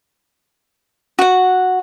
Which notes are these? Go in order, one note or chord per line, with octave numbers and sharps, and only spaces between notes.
F#4 F#5